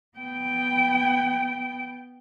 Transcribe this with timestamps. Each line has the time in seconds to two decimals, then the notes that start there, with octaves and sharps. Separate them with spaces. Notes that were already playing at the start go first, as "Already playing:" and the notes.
0.18 B3 G5